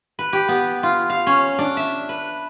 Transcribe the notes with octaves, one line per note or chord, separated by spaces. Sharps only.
B4
G4
B3
F4
F5
C#4
D4
E5
B4